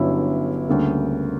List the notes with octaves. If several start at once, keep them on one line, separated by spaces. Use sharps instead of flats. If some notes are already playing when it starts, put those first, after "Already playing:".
Already playing: G1 G2 F#3 C#4 E4
D2 C#3 G3 A#3